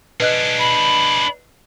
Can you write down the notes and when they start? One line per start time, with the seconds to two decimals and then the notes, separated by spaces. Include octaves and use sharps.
0.20 D4 G#4 B4 D#5 F#6
0.59 B5